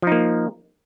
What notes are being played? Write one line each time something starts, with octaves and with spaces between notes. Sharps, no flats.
F3 A#3 D#4